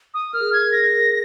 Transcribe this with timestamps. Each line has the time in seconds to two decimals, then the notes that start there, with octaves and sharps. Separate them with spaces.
0.14 D#6
0.33 A#4 F6
0.40 G#4
0.53 G#6
0.66 A#4
0.72 A#6
0.91 A#4